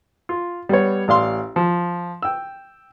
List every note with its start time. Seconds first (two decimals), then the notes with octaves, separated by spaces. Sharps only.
0.29 F4
0.69 G3 B3 C#5
1.08 A1 D5 F5 C6
1.56 F3
2.22 G5 E6